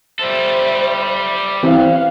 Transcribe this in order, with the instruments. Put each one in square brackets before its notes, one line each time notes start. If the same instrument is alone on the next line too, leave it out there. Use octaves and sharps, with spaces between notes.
[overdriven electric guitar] G3 A4 [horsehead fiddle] C5 E5
[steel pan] E3 C4 [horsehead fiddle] F5 F#5